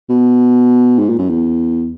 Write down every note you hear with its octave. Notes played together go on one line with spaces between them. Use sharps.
B2
G#2
A#2
F#2
E2